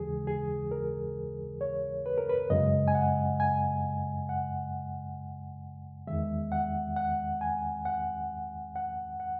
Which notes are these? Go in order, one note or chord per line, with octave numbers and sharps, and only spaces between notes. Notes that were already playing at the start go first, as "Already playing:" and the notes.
Already playing: D#2 C#3 E3 G#3 G#4
G#4
A#4
C#5
B4
A#4
B4
F#2 C#3 G#3 D#5
G#5
F#5
G#5
F#5
E2 D#3 G#3 E5
F#5
F#5
G#5
F#5
F#5
F#5